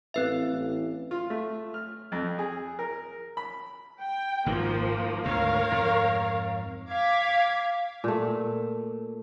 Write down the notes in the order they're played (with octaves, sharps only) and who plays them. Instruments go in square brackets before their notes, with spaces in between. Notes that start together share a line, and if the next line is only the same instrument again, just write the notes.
[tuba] A1 [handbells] C4 B4 E5
[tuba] A1
[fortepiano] F4
A3
F6
F2
G#4
A#4
B5
[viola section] G5
[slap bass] G#1 D#3 [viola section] F3 A#3
[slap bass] D2 G#2 [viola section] A#4 C#5 F5
[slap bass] F2 G#2
[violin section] F5 D6 G#6 B6
[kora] A#2 A3